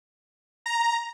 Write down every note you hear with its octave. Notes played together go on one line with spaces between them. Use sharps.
A#5